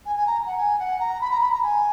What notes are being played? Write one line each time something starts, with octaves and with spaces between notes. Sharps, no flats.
G#5
G#5
A#5
F#5
G#5
F#5
A#5
B5
A#5
B5
A#5
G#5